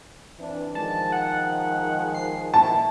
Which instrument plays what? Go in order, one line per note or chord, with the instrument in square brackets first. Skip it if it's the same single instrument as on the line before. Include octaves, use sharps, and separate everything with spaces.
[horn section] E3 C4 D4
[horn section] D#3 F3 G#3 [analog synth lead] A5
[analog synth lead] F#5
C7
[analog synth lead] E4 [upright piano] A5